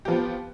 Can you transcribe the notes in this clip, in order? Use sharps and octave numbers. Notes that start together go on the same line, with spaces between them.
F3 B3 G4